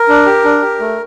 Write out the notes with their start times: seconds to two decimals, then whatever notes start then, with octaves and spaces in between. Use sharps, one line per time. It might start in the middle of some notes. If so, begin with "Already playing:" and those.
Already playing: A#4
0.09 D4
0.26 G4
0.44 D4
0.62 G4
0.80 A3